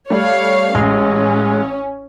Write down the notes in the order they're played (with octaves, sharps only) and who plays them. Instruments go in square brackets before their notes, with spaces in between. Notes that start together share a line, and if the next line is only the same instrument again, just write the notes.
[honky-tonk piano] G3 A3 [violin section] C#5 F5
[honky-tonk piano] A1 [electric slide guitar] G#3 [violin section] C#4